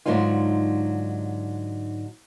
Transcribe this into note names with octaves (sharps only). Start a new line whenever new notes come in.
G#2 D3 F#3 D#4 F4